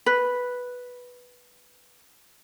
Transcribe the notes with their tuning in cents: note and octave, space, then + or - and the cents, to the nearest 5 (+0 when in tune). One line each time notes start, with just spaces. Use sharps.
B4 -5